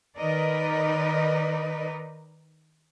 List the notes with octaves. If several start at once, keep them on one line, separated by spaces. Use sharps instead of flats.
D#3 D#4 A#4 B4 D5 D#5